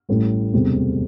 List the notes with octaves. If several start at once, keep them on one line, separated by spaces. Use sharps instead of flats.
A1 A2 G3
E1 D2 C3 G3